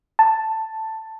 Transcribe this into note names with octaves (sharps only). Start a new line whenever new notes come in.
A5